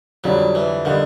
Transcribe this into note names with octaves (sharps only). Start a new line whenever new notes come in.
F2 D3 F#3 G3
E3
D3 D#3 G3